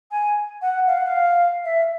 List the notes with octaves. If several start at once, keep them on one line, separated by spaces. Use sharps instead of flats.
G#5
F#5
F5
F#5
F5
E5